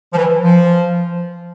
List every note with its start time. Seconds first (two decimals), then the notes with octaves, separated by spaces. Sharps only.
0.13 F3
0.17 E3
0.42 F3